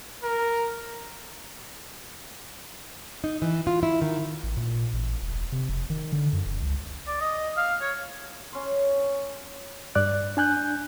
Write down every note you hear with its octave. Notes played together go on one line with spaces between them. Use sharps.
A#4
D#4
E3
F4
E4
D#3
A1
A#2
A1
E1
C3
F1
D#3
D3
F#2
F1
C#2
D5
D#5
F5
C#5
C#4 C6
G2 D5 F#6
D4 G#5 F#6 G6